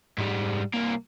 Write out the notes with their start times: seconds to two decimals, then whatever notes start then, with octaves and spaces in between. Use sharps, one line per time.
0.18 G#2 G3
0.74 C2 A#3